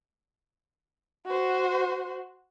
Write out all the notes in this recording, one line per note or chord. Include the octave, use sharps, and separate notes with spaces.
F#4 C5